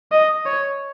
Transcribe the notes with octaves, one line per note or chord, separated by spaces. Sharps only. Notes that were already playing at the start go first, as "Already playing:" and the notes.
D#5
C#5